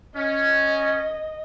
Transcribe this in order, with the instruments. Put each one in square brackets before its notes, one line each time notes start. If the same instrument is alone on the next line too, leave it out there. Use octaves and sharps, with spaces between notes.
[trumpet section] C#4 [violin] D#5